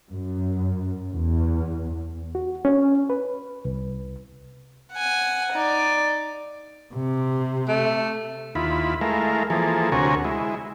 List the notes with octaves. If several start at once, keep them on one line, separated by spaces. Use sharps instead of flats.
F#2
E2
F#4
C#4
B4
C2
F#5 G#5
D#4 D5
C3
A3
D#2 E4 F4 B5
G#3 A3 E4 A#4 F5
E3 F3 A#3 G#4 A4
D2 C3 F#4 A#4 C#5 G#5
G#3 E4